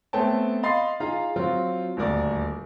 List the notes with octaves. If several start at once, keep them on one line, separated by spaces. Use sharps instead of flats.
A3 B3 C4 C#5 G5 A5
D#5 F5 B5 C6 A6 C7
D#4 F4 G#4 F5 A#5
F#3 C4 F4
D#1 D2 A#4 D5